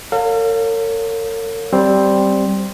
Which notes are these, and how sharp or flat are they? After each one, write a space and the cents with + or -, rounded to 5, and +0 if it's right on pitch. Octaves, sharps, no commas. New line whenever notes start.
A#4 -45 C#5 +0 F5 +25
G3 -5 C4 +0 C6 +0